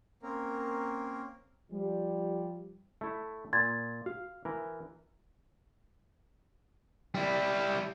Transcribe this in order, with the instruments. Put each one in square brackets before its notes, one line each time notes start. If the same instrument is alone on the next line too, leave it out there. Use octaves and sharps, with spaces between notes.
[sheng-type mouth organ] A#3 C4 C#4 A#4
[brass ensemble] F3 G3
[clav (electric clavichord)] A3 E4
[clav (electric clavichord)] A#2 [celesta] C6 G#6 A6
[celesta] F#4 [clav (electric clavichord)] F5
[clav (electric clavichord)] E3 A#4
[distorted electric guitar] G3 E4